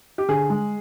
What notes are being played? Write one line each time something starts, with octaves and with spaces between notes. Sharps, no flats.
G4
D3 G#4
G#3